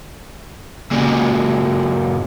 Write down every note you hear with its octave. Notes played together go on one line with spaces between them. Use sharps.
A#2 C#3